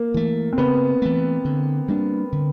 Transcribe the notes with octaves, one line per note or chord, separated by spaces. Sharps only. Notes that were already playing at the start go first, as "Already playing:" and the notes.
Already playing: A#3
E3 A3
C4
C#3 B3
E3 A3
D3
G3 A#3 D4
D3